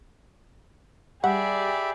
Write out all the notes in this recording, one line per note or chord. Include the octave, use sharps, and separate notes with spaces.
G3 G4 G#4 D5 E5 F#5 B5